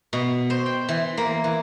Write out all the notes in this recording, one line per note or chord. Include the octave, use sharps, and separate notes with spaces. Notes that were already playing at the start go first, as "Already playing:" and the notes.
B2
C5
G5
E3
A#3
E3